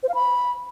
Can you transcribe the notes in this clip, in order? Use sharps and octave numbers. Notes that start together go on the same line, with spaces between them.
C5
F5
B5